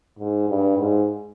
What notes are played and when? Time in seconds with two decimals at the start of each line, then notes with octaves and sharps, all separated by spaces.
0.19 G#2
0.49 G2
0.77 G#2